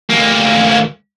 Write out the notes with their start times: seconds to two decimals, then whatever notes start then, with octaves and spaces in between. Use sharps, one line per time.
0.10 D2 A#3